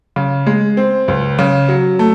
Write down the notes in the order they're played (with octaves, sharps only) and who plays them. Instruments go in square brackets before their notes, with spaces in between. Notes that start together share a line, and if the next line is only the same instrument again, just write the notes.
[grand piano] C#3
G#3
C4
C#2
C#3
F#3
A3